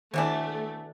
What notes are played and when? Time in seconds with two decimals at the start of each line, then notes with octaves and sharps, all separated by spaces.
0.14 B2 D#3 E3 A3 D4